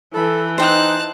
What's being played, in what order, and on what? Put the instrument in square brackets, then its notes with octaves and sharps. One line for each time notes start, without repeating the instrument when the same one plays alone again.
[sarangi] E3 [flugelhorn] A4 [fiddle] B5
[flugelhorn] D#4 [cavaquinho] C5 G5 [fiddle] A5 F#6